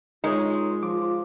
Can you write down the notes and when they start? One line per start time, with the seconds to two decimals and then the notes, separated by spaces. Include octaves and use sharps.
0.24 G#3 D#4 F4 A#4 C#5
0.83 F3 D6